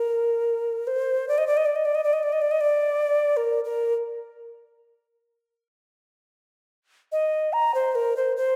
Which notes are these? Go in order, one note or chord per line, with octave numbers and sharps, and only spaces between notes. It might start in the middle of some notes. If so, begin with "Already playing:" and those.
Already playing: A#4
C5
D5
D#5
D5
D#5
D5
D#5
D5
D#5
D5
D#5
D5
D#5
D5
D#5
D5
A#4
A#4
D#5
A#5
C5
A#4
C5
C5